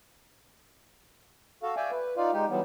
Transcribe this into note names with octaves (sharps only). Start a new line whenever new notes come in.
F#4 A4 F5
D5 E5 F5 G5 G#5
B4
D#4 F4 D5 F5
G#3 D#4 G4
E3 F#3 G3 B3